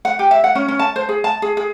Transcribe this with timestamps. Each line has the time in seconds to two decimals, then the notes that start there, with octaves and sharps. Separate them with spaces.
0.05 F#5
0.19 G4
0.31 E5
0.44 F#5
0.55 C#4
0.68 C#4
0.79 A5
0.96 C5
1.09 G#4
1.24 A5
1.42 G#4
1.57 G#4